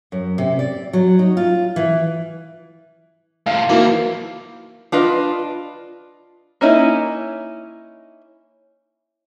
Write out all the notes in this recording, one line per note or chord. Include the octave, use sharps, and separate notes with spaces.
F#2
C3
D5
F#3
D#4
F4
E3
A2 C3 F5
E3 F3 A#3 D#4 E4 F#4
D4 F4 B4 D#5
A#3 C#4 D#4 E4